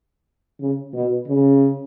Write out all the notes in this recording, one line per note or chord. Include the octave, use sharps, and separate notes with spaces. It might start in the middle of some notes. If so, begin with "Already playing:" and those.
C#3
B2
C#3